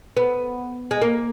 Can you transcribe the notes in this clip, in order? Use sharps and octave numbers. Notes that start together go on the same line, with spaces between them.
B3
G#3
A#3